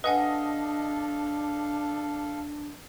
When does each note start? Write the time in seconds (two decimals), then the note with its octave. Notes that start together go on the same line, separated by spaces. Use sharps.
0.04 D4 A4 B4 D#5 F5 F#5 G#5